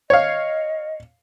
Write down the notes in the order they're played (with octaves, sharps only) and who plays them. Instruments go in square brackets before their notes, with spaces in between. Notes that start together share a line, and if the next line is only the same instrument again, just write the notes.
[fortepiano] C#5 F5 [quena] D#5